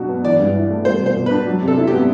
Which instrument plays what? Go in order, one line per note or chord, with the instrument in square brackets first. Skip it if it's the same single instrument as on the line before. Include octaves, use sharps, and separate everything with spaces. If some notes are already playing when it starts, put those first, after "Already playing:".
Already playing: [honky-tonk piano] B2 F#3 D4 F#4
B3
[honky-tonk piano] E3 [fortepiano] D5
[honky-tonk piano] G2
E4
A3
[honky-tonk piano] G3 [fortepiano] C5
[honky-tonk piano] B2 [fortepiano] C5
[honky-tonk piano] B2
[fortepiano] B4
[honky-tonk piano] D4
F#3
C3
[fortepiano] A4
[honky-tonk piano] E4
[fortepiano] G4
[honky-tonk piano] B3